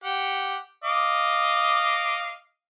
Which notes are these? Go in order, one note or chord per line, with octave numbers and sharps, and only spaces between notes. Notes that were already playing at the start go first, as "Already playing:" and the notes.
G4 F#5
D#5 F5 D6